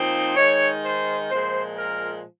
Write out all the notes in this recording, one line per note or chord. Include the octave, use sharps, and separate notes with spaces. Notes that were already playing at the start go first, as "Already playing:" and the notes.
Already playing: A#2 F3 C4 D#4
D#3 G#3 D#4 C#5
C5
A#2 F3 G#3 C5
A#4